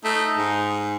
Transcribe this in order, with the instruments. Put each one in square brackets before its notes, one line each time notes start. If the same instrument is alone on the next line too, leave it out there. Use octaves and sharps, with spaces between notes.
[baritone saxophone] A3 [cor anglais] D#4
[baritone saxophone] G#2